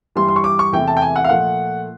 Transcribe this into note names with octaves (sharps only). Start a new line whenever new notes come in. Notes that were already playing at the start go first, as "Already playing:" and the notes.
G2 E3 G3 C6
C6
C#6
D6
C#6
E2 C3 E3 A3 G5
A5
G5
G#5
F#5
F5
A#2 F3 A3 F#5